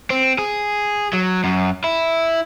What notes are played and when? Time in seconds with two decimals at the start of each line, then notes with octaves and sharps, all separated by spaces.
0.10 C4
0.39 G#4
1.13 F#3
1.44 F#2
1.84 E4